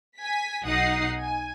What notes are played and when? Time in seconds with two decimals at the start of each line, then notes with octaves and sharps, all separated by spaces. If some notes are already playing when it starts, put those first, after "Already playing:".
0.18 G#5 B6
0.64 B1 D#4 F#5 D#6 C7
1.20 G#5